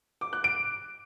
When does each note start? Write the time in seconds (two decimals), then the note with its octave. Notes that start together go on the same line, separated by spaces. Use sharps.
0.21 D6
0.33 F#6
0.44 D7